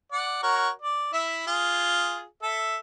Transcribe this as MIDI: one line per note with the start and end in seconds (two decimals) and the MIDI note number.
0.12 0.41 74
0.12 0.41 78
0.43 0.69 66
0.43 0.69 70
0.43 0.69 73
0.82 1.08 74
1.13 1.42 64
1.13 1.42 76
1.47 2.25 65
1.47 2.25 68
2.42 2.76 69
2.42 2.76 76